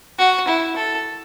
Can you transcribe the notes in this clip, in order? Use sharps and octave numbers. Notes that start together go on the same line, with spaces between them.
F#4
E4
A4